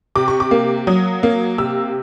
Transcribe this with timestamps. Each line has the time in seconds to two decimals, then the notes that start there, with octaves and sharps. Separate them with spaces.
0.16 C3 D6
0.28 C#6
0.40 D6
0.51 A#3
0.87 F#3 D#6
1.23 A#3
1.58 C3 E6